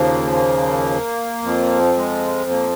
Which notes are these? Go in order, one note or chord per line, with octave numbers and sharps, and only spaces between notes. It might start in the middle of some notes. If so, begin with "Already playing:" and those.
Already playing: D#2 C#3 F3 A#3
A#3
F2 F3
G#3
A#3